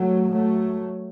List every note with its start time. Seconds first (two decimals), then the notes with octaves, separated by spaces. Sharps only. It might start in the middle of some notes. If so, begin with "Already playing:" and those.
Already playing: F#3 A3
0.31 F#3 A3